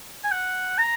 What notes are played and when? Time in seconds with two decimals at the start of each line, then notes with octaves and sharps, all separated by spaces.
0.24 G#5
0.32 F#5
0.78 A#5